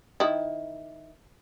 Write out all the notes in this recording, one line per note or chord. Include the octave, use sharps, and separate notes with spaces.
D#3 E4